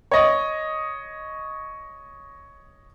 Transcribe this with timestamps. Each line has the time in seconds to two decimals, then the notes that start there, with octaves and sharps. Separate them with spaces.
0.11 C#5 D#5